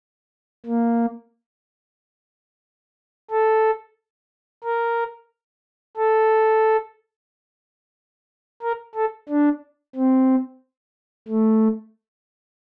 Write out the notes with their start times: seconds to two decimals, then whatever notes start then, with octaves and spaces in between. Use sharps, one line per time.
0.66 A#3
3.31 A4
4.64 A#4
5.97 A4
8.62 A#4
8.95 A4
9.29 D4
9.95 C4
11.28 A3